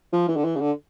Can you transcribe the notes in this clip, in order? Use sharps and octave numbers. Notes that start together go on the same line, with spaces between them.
F3
E3
D3
E3
C#3
D3